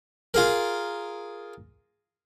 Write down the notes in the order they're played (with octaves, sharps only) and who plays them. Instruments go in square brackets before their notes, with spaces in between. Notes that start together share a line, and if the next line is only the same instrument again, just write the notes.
[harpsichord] F4 G#4 A#4